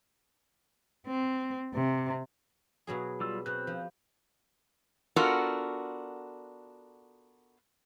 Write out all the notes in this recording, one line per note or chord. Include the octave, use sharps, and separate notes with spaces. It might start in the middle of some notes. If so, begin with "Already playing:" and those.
C4
C3
B2 F#3 G#4
G3 F4 E6
B2 C4 F#6
F3
B3 D4 F4 F#4 A4 A#4